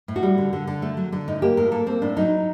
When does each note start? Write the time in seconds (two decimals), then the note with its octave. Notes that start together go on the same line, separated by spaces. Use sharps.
0.08 A2
0.16 F#4
0.23 G3
0.38 D3
0.53 D3
0.67 D3
0.82 A3
0.97 F#3
1.12 D3
1.28 A2 D#4
1.42 A#3 G4
1.57 A2 A#4
1.72 A#3 A4
1.87 A#3 C4
2.02 A2 D4
2.17 F#3 D#4